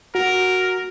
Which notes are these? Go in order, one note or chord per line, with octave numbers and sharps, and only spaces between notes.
F#4 A#4